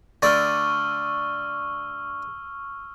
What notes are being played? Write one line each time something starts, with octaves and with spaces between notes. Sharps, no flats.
D3 A3 D5 C#6 E6 F6